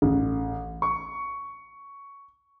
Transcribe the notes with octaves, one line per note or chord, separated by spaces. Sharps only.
A1
C#6